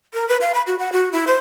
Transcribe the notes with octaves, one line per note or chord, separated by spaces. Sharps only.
A#4
B4
F5
B5
F#4
F#5
F#4
E4
C5